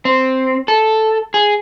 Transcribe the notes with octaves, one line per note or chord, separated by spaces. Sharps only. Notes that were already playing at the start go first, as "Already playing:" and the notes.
C4
A4
G#4